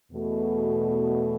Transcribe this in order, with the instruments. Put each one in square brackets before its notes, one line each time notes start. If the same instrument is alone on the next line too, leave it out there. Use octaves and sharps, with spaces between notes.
[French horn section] E2 B2 A3